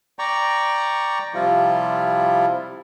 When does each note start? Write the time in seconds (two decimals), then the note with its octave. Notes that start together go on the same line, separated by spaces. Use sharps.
0.19 D5 G5 A#5 C#6
1.34 C3 F3 G3 E4 F4